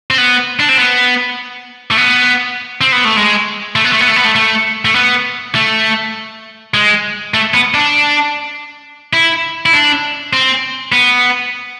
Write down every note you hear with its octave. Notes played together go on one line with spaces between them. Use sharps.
C4
B3
D4
C4
B3
A3
B3
C4
B3
A3
G#3
A3
B3
A3
B3
A3
B3
A3
A3
A3
B3
A3
G#3
A3
B3
D4
E4
E4
D4
C4
B3